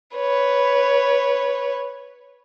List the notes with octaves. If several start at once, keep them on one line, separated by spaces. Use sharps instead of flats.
B4 C#5